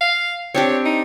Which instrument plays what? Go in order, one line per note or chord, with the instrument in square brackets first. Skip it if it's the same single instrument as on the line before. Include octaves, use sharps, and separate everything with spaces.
[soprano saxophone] F5
[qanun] C4 D4 G4 [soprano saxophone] C#5
[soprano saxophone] D#4